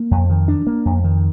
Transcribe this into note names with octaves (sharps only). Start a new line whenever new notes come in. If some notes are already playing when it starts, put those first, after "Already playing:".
Already playing: A#3
F2
D#3
D4
A#3
F2
D#3